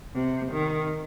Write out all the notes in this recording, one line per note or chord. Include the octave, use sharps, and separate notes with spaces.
C3
D#3